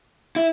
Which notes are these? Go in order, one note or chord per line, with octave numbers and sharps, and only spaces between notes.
E4